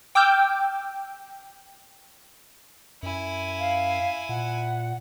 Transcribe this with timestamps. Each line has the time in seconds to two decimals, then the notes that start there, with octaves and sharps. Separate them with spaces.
0.15 G5 D6 E6 F6 G6
3.03 F#2 E4 G#5
3.59 F5
4.29 A#2 F#5